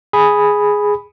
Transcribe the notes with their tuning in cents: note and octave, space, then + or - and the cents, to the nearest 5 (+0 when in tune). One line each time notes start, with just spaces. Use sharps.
G#4 +0 B5 +0